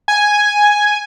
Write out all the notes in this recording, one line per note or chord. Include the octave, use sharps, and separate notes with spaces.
G#5